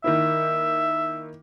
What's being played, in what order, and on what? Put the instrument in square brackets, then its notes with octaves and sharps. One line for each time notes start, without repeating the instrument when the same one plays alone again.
[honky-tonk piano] D#3 A#3 E4 [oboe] E5